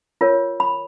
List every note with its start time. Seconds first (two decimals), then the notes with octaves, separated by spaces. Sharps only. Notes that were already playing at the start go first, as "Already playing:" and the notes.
0.21 F4 A#4 C#5
0.60 B5